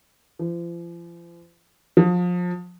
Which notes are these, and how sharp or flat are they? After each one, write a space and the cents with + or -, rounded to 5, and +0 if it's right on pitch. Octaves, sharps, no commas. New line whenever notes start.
F3 -40
F3 +30